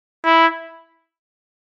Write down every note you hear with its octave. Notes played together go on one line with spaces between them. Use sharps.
E4